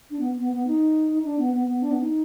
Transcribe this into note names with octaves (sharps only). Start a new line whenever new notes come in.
D4
B3
B3
B3
D#4
D4
B3
B3
B3
D4
B3
D#4